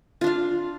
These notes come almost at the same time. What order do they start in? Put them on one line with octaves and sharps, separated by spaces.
F4 D4 F5